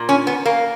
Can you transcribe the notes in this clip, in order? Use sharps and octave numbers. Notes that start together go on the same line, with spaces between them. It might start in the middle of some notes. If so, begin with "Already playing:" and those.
Already playing: A#2
C#4
B3
A#3